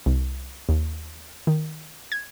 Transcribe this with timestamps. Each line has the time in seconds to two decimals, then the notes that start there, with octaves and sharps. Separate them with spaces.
0.06 C2
0.69 D#2
1.47 D#3
2.12 G#6